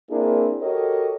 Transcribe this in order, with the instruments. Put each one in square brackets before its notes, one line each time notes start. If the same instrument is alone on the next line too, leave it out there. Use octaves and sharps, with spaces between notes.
[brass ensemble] A#3 C4 D4 E4 G#4 A#4
F#4 G4 A4 A#4 C#5 D#5